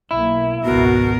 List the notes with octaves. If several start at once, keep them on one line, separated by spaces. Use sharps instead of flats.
B1 A#3 E4
G#1 C#2 B2 F#4 A#4